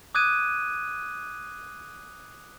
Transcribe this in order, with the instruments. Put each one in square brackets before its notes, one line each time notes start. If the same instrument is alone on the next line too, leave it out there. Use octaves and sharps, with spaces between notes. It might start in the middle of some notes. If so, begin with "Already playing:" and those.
[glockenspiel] D6 D#6 F#6 G#6 D#7